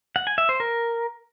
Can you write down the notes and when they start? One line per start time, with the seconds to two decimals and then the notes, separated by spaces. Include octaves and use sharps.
0.16 F#5
0.27 G#5
0.38 E5
0.49 C5
0.60 A#4